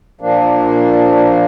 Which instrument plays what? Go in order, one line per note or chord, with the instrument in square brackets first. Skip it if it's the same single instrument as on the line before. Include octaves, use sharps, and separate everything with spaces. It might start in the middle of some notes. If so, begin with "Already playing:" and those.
[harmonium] A#2 F3 A#3 D4